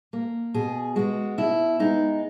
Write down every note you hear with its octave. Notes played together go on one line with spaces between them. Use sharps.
A#3
B2 G#4
G#3 B3 F#4
B2 E4
G#3 B3 D#4